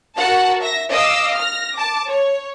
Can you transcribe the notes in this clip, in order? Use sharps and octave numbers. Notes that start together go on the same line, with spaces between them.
F#4 A#4 F#5 A5
E5 A#6
D#5 F5 D6 E6
F6 A#6
A5 D6
C#5